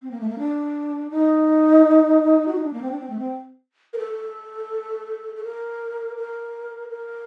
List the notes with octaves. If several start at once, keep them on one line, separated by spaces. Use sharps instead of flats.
C4
A#3
A3
A#3
D4
D#4
F#4
D#4
D4
A#3
C4
D4
C4
A3
C4
A#4
A4
A4
A#4
A#4
A#4